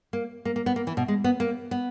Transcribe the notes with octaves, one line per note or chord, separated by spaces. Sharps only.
A#3
A#3
A#3
B3
A#3
E3
B2
G#3
B3
A#3
B3